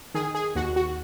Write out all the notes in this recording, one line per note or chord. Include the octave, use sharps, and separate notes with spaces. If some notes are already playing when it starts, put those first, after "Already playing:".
D#3 G#4
G#4
D#2 F#4
F#4